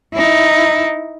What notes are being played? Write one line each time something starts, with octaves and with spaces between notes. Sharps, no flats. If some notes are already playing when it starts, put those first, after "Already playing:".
D#4 E4